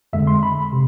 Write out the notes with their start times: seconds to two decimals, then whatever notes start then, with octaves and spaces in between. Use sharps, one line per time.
0.13 F2 D3 G#3 E5
0.27 C6
0.43 B5
0.72 C3